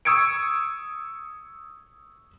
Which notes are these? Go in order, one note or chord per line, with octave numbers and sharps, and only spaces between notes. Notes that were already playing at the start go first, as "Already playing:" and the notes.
C#6 D#6 E6 G#6 C#7 D7